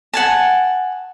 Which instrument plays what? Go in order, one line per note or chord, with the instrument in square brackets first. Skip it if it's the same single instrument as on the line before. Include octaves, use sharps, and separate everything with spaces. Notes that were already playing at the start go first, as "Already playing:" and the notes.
[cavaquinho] F#5 G#5 A5